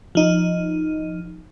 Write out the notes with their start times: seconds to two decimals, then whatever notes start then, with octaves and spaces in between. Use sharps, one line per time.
0.15 F3 D#4